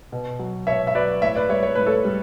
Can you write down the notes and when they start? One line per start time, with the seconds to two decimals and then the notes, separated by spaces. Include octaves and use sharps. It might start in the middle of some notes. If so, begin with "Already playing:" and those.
0.12 B2
0.39 F#3
0.67 B2 C#5 E5
0.87 E5
0.95 F#3 B4 D5
1.22 A2 C#5 E5
1.35 B4 D5
1.50 G3 C#5 E5
1.63 C#5
1.75 A2 B4
1.86 A4 C#5
2.05 G3